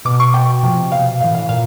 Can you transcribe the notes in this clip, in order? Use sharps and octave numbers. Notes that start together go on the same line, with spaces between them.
B2 D6
C#6
B2 G5
C3 F3
B2 F5
A2 E3 F5
F5
A#2 F5